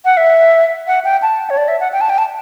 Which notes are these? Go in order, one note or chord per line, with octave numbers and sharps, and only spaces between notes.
F#5
E5
F#5
G5
A5
C#5
D5
E5
F#5
G5
A5
G5
A5